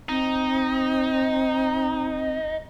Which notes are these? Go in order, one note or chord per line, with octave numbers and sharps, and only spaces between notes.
C4 D#4